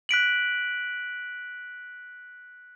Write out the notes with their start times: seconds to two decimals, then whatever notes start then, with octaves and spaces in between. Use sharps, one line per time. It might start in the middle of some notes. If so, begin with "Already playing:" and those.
0.09 F#6 B6 D7 F#7